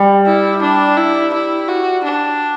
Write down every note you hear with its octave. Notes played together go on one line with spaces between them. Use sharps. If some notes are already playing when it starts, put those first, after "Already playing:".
Already playing: G3
E4
D4
E4
E4
F#4
D4